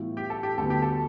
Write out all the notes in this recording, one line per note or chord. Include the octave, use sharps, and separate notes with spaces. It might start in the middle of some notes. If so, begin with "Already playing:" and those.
Already playing: A2 E3 G3 B3 F4
G4
A4
G4
D2 D3 G3 B3 A4
G4
A4